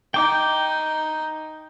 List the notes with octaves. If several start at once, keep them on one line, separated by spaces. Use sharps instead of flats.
D#4 G5 D6